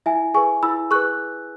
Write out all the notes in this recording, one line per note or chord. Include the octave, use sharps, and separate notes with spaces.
E4 E5 G#5
G#4 B4 G#5 C#6
E4 B5 E6
G#4 B4 C#6 F#6